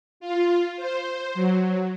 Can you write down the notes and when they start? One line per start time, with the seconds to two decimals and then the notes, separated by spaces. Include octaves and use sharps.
0.20 F4
0.77 C5
1.34 F#3